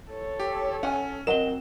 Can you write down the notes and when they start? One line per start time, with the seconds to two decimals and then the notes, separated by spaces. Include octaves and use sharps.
0.10 A4 C#5
0.40 G4
0.83 C#4 F#5 G#5
1.27 F#3 C4 F#4 A#4 D#5 F#5 E7 G7